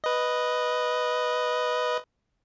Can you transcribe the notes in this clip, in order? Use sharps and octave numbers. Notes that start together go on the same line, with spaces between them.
B4 D#5